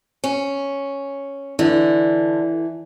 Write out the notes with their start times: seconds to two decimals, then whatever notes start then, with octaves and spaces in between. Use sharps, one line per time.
0.24 C#4
1.59 D3 E3